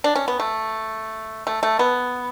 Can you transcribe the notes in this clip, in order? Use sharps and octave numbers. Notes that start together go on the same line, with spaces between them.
D4
C#4
B3
A3
A3
A3
B3